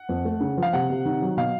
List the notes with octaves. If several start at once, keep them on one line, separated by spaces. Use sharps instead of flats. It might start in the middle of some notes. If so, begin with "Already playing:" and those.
Already playing: F#5
F2
A3
C#3
F3
F5
C3 F#5
C3
D#3
F#3
B2 F5